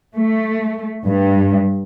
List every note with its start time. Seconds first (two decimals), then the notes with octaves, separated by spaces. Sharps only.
0.15 A3
1.05 G2